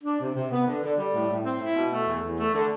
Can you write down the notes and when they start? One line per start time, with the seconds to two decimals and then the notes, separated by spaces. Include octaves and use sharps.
0.04 D4
0.20 C3
0.35 C3
0.52 B3
0.67 D3
0.83 D3
0.98 G3
1.14 A2
1.29 A2
1.46 C4
1.61 E4
1.76 B2
1.92 A3
2.07 E2
2.24 E2
2.40 A3
2.55 D3